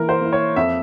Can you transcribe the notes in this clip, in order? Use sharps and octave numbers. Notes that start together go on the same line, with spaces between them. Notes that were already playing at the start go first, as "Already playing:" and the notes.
Already playing: E3 A#3 E4 A#4
C5
A#3 E4
C#5
F2 E5